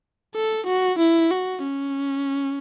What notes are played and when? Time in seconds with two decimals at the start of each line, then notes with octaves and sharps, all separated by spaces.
0.35 A4
0.66 F#4
0.99 E4
1.31 F#4
1.63 C#4